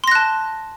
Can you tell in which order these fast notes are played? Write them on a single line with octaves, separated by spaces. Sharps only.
C6 A#6 F#6 A5